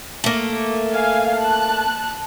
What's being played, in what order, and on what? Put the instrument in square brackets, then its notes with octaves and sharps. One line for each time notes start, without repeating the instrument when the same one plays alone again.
[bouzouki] A3 A#3
[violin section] F5 G#5
A5 F#6